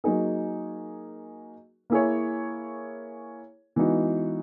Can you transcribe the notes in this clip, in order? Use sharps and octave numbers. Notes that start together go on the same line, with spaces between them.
F#3 A#3 D#4 G#4
A#3 E4 G#4 C#5
E3 G#3 B3 D#4 F#4